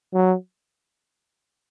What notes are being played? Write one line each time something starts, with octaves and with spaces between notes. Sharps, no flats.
F#3